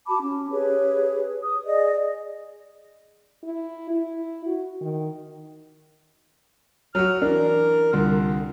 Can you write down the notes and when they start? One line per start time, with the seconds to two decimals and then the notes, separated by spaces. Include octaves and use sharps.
0.07 F#4 A5 B5 D6
0.20 C#4
0.51 G4 G#4 B4 C#5
1.42 D#6
1.65 G#4 D5 D#5
3.44 E4
3.91 E4
4.46 F#4
4.81 D#3
6.95 F#3 F#4 F6
7.22 E3 D4 A#4
7.93 C2 D3 F4